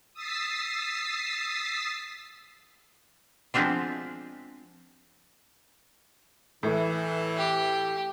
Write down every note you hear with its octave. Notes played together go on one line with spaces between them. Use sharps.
D#6 E6 A6 B6 C7
F3 G#3 B3 C4 D4 F4
A2 E3
G4